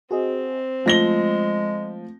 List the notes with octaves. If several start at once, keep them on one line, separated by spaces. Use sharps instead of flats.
C4 F#4 G#4 D#5
F3 G#3 A3 A#6 G7